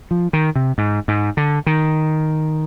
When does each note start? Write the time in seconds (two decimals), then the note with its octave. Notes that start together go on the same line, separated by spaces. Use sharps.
0.11 F3
0.33 D#3
0.56 C3
0.78 G#2
1.08 G#2
1.37 D3
1.66 D#3